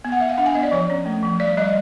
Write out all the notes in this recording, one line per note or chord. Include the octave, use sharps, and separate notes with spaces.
B3 G#5
F#5
B3 E5
F5
D4 F#5
G#5
B3 D#5
D5
F3 C#5
C#4
A3
F3
G3 D5
G3 D#5